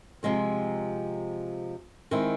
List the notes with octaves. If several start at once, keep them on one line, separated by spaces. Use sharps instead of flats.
C3 F3 G#3 C4
D#3 G#3 C4 E4